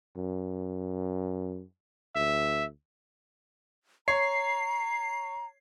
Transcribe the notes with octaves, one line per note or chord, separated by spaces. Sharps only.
F#2
D2 E5
C#5 A#5 C7